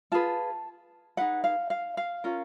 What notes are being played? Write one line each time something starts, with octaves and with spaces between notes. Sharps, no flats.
F4 G#4 B4 A5
D#4 G#4 B4 F#5
F5
F5
F5
C#4 F4 A#4